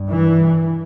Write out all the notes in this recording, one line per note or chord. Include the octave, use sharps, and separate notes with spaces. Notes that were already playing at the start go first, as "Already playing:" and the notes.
Already playing: G2
E3